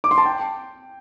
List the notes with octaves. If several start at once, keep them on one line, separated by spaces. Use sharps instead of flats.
D6
C6
A5
G5